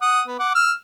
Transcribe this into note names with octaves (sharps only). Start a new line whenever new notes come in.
F#5 D#6
B3
F#5 D6
E6 F6